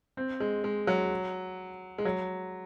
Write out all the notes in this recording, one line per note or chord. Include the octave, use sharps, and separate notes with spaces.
C4
G#3
G#3
F#3
G#3
F#3